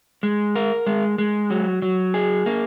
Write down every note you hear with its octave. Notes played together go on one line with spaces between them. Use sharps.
G#3
A#4
G#3
G#3
F#3
F#3
G#4
A#3